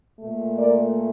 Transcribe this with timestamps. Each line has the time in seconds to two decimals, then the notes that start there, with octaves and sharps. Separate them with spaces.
0.19 A#2 A3
0.57 A#4 D5